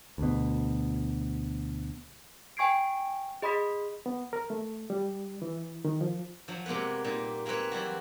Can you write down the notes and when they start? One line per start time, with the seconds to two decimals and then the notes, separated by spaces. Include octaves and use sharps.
0.18 D2 B2
2.57 G5 G#5 C#6 G#6 C7 D7
3.42 G#4 D#5 B5 C6 D#6 B6
4.06 B3
4.33 A#4
4.50 A3
4.90 G3
5.42 E3
5.85 D#3
6.01 F3
6.48 F3 F#3
6.66 C3 G#3 A#3 B3 B4
7.04 A#2 G3 D#4
7.46 G#3 A#3 C4 B4 C#5
7.72 E3 F#3 G3 F#4